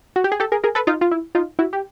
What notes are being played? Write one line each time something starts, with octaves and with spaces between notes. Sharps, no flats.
F#4
G4
G#4
G4 A4
G#4 A#4
G#4 A#4
A4 B4
D#4 F4
F4
E4
D#4 F4
E4 F#4
G4